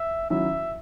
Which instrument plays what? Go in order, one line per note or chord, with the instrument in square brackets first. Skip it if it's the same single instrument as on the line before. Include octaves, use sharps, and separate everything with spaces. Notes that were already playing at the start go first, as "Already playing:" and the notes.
Already playing: [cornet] E5
[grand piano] D#3 F#3 C#4 E4 [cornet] E5